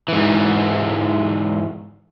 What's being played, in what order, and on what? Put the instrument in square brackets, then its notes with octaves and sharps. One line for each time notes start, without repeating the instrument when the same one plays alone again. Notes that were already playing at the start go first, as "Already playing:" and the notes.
[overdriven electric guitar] G#2 E3